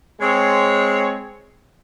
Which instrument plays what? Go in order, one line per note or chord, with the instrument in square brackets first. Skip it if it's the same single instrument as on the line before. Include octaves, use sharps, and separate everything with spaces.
[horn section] G#3 C4 C#5